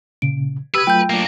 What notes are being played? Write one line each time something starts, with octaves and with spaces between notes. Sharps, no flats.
A#2 C#3 D7
G4 B4 D#6 E6 G#6
F#3 A3 F4 G5 G6
A#3 D4